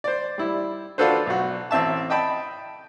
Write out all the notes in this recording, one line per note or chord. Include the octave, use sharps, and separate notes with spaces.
C5 D5
G3 E4
D4 F4 F#4 A4 B4 C5
B1 F#4
A1 C4 E5 A5
D#5 G5 A5 B5